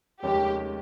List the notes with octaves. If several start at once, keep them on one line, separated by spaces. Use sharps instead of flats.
F1 D#2 D#3 G#3 C#4 G4